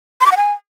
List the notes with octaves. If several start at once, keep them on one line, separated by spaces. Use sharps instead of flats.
C6
D6
F#5
G#5